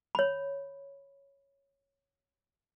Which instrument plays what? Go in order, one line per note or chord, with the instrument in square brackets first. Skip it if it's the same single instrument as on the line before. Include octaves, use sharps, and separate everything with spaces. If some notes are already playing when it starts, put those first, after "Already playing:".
[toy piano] C#5 B5